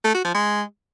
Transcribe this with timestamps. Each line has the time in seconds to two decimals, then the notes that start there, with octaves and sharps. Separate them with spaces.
0.05 A3
0.15 F#4
0.25 F3
0.35 G#3